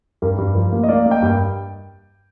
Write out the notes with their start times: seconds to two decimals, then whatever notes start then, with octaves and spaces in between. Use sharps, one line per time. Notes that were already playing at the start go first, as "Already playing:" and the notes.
0.22 G2 G4 A#4
0.38 G2
0.55 F3
0.73 A#3
0.84 D#5
0.89 A#3 D5 F5
1.06 A#3
1.11 D#5 G5
1.22 G2 G5